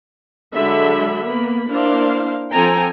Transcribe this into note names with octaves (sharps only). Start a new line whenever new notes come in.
D3 F#3 G#3 E5 B5
A#3 B3 B5
A#3 D4 E4 A#4 C5 F5
F3 C4 A4 G5 G#5 A#5